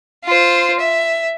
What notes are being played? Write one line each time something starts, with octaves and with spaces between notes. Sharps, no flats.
F4 C5
E5